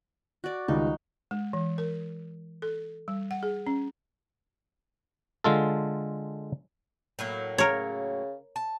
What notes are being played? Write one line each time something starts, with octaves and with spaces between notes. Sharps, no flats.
F#4 D5
C#2 D#3 G3 D#4
G#3
E3
A#4
A4
G3
F#5
G#4
C#4
D3 G#3 F4 A4
A2 F#3 A#3
C#3 A#4 C#5
A5